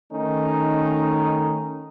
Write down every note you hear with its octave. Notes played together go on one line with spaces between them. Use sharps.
D#3 A3 C#4 D#4